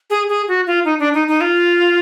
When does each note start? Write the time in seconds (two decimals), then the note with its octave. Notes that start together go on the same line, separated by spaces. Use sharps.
0.10 G#4
0.29 G#4
0.48 F#4
0.67 F4
0.85 D#4
0.99 D4
1.14 D#4
1.28 D#4
1.41 F4